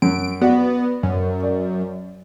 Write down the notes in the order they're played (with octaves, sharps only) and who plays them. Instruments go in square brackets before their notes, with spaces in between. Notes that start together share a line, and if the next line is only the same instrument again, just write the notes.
[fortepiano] F#2 [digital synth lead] D7
[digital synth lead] B3 [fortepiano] F#4 D5
[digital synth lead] F#2
[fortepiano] D5